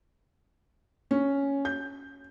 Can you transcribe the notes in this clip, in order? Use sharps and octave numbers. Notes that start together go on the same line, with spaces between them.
C#4
G6